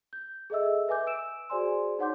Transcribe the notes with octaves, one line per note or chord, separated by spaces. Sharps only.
G6
G#4 A4 D#5 E5 E6
B4 E5 G#5 D6 G6
E6 D7 E7
F#4 G#4 C5 D5 G#5 C6
D#4 C#5 F#5 C6 D6 G6